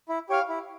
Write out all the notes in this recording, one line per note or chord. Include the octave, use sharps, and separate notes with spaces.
E4
G4 C#5 F5
E4